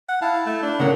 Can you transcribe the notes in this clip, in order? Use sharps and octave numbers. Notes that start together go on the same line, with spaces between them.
F#5
E4 F5 A5
A3
D4
A2 C#3 A#3 F#5